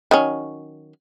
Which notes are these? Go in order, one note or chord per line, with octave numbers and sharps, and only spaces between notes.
D#3 F#3 C#4